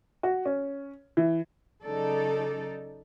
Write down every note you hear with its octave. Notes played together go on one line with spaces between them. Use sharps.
F#4
C#4
E3
C#3 F#3 D#4 A4 D5